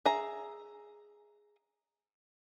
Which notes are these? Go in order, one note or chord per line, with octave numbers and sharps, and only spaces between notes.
G#4 E5 A#5